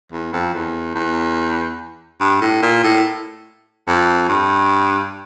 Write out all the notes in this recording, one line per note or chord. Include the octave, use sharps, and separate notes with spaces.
E2
F2
E2
E2
G2
A2
A#2
A2
F2
G2